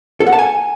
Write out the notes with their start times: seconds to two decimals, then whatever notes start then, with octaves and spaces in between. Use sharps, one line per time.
0.20 A4
0.26 F#5
0.33 A5
0.39 G#5